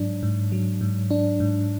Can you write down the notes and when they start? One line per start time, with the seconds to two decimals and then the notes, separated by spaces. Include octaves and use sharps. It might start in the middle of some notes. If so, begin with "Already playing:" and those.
Already playing: G#2 F#3 D4
0.23 G#2
0.52 F#3
0.81 G#2
1.11 D4
1.40 G#2